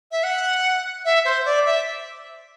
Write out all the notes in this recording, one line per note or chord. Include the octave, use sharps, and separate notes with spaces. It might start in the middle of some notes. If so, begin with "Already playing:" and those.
E5
F#5
E5
C5
D5
E5